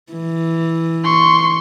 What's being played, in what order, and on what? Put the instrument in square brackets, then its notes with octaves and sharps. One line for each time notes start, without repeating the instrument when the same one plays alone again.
[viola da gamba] E3
[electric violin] C6 C#6